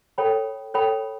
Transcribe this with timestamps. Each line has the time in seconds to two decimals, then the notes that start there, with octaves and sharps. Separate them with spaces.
0.18 A4 C#5 G5 B5
0.74 A4 C#5 G5 B5